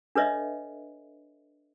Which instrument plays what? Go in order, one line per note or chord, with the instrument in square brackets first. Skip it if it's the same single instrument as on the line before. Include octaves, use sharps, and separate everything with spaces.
[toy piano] D4 A4 B4 C#5 D#5 E5